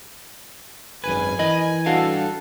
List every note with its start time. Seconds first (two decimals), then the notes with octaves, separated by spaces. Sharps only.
1.04 G#1 F#2 B4 G#5
1.39 E3 A#4 D#5 B5
1.86 G3 D4 F#4 A4 F5